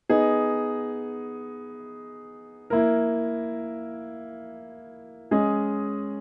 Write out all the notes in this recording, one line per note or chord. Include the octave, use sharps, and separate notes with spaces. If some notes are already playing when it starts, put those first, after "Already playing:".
B3 D#4 G#4 D#5
A#3 E4 A#4
G#3 C#4 G#4 D#5